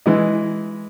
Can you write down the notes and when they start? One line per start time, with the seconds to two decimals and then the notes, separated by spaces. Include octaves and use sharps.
0.06 E3 G#3 D#5